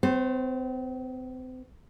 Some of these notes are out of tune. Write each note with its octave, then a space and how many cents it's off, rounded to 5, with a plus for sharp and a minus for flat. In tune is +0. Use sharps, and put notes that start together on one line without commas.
C4 -40 C5 +35